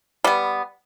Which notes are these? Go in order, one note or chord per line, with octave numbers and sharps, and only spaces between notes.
G3 B3